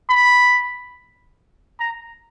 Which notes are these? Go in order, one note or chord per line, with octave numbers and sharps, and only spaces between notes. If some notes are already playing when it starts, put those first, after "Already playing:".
B5
A#5